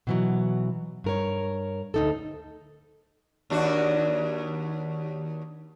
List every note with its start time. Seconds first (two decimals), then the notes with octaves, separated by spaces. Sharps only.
0.07 B2 E3 F#3
1.04 G2 A#4 C#5
1.94 D2 D#4 A4
3.50 D#2 D4 F#4